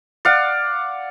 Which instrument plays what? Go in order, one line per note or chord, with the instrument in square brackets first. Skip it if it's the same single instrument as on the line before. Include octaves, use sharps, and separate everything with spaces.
[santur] D5 F5 F#5